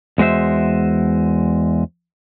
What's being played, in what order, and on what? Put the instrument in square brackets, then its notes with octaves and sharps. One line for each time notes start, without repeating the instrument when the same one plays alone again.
[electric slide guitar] E2 G#3 F#4 C5 E5